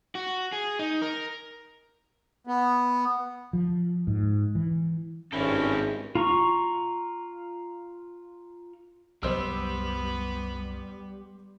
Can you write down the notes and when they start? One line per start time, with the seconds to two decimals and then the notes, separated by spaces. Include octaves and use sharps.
0.15 F#4
0.52 G#4
0.79 D#4
1.02 A#4
2.47 B3
3.53 F3
4.07 G#2
4.55 E3
5.33 G#1 G2 C4 C#4 E4 A4
6.15 F4 A#5 C#6
9.23 C2 F#2 G3 B3 C5 E6